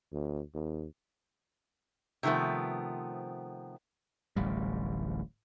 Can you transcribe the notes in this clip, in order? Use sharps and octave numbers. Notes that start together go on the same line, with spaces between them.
D2
D#2
C3 D#3 F3 A3 B3
D1 A1 G3